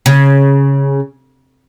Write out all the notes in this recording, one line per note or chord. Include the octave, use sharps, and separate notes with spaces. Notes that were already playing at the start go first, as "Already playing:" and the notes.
C#3